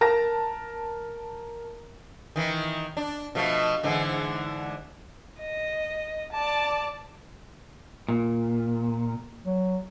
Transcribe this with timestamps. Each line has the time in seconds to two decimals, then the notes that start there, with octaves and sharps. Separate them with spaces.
0.01 A#4 A5 A#6
2.36 D#3 E3
2.97 D4
3.35 B2 F3 A3
3.83 G#2 D3 E3
5.39 D#5
6.32 D5 A5
8.08 A#2
9.46 F#3